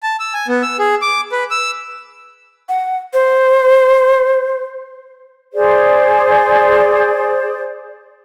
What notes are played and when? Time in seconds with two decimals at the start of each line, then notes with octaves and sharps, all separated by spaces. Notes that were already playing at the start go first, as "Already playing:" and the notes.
0.03 A5
0.20 E6
0.34 G#5
0.48 B3
0.62 E6
0.79 G#4
1.02 D6
1.32 B4
1.51 E6
2.69 F#5
3.13 C5
5.54 G#4 C5 D5